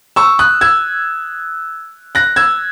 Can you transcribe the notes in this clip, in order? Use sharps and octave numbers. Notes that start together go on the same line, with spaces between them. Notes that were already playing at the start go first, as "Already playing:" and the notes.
C#6 E6
D#6 F#6
E6 G#6
F#6 A#6
E6 G#6